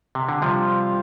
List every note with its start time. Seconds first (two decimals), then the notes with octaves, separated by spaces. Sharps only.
0.15 C3
0.29 D3
0.42 C3 F3 G3 F4 C5